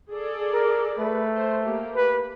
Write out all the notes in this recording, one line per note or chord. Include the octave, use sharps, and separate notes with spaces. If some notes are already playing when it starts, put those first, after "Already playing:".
G#4 A4 D5
A#4
A3 B4
C5
A#3 G4
B4